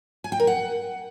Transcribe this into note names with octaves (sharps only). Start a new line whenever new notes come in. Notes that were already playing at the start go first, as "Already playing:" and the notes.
G#5
G5
A#4
F#5